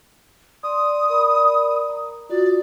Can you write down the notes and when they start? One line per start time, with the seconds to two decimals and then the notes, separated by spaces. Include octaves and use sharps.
0.63 D5 C6 D#6
1.10 A#4 D5 B5
1.89 A#5
2.29 F4 F#4 D5 D#6